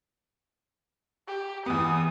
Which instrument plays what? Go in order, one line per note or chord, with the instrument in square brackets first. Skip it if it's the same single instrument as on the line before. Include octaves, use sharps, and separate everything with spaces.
[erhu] G4
[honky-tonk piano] E2 B3 [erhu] D#6